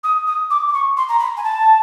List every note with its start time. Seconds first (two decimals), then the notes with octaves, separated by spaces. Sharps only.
0.03 D#6
0.26 D#6
0.50 D6
0.68 D6
0.73 C#6
0.97 C6
1.08 A#5
1.19 B5
1.36 G#5
1.43 A5